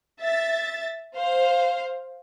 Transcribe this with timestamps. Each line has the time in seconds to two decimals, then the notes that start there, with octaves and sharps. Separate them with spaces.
0.20 E5 A6
1.15 C5 F5